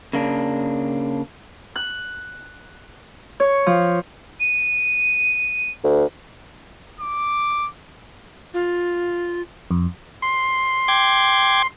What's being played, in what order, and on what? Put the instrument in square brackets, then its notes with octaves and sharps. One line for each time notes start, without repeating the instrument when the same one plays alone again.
[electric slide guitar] C#3 A#3 D4
[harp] F#6
C#5
F3
[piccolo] D#7
[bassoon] D2
[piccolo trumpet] D6
[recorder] F4
[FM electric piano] F2
[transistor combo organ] C6
[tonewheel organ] G5 D6 G#6